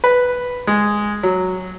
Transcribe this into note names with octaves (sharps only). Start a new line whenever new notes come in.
B4
G#3
F#3